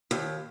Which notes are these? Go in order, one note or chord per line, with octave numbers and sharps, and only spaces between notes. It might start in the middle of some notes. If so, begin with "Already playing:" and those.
D#2